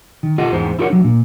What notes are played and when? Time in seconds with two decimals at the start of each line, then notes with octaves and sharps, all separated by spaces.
0.23 D#3
0.38 F4 G4 A4 D#5 F#5
0.52 E2 G#2 G#3 B3 C5
0.79 E4 F4 G4 A#4 C#5 F#5
0.90 F#3 D4
1.04 A#2